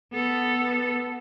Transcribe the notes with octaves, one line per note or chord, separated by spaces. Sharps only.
B3 A4